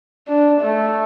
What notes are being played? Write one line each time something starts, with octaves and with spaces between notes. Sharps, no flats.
D4
A3